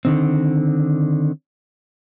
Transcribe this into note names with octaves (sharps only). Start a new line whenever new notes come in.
D3 D#3 C4